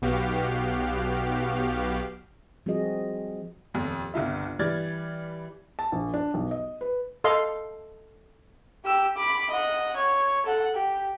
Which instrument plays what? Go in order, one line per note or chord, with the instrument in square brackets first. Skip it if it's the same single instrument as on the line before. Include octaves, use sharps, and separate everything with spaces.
[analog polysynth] B1 B2 B3 F#4 G4 F5
[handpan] F3 G3 C4 F#4 G#4 D#5
[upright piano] D#1 F2
G1 C2 F4 E5
E3 G3 D5 F6 G#6 A6
[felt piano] A5
A#1
D4
B1
D#5
B4
[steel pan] A4 D#5 F5 C6
[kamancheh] G4 E6
B5 D6
D#5 F#5
C#5
A4 F#5
G4